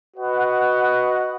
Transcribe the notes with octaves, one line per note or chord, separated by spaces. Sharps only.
F#4 B4 D#5 F#5